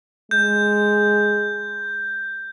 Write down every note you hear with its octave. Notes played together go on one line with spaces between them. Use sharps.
G#3 G6